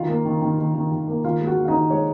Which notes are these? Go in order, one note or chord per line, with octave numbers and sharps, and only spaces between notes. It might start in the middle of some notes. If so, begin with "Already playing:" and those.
Already playing: D#3 F4 F5
A#3
D#3
D#3
D#3
D#3
D#3
A#3
D#3 F4 F5
G#3
F#4 F#5
D#3
F5
D#4 D#5
D#3
G#3 C#5